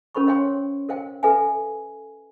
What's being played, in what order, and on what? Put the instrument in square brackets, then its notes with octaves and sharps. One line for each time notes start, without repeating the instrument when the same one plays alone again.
[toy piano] C#4 A#4 C5 B5 C#6
C5 C#5 F5 G5 C6
A#4 C5 F5 G5
A4 B4 E5 F5 G#5